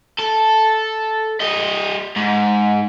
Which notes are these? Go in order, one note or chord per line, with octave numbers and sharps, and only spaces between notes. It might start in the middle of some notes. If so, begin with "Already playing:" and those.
A4
G3 D#5
G#2